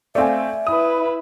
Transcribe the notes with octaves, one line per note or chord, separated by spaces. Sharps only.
A3 C4 D5 E5 F5 G#5
E4 B4 D#6